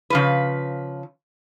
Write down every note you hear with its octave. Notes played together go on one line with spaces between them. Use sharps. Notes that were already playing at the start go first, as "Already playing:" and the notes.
C#3 F3 B4